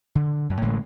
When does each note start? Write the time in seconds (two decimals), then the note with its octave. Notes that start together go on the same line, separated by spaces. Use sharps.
0.15 D3
0.50 F#2
0.62 A1 A2 D3 G#3